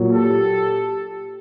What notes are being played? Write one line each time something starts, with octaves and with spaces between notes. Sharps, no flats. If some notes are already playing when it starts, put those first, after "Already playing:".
Already playing: A#2 F#3
G4 A4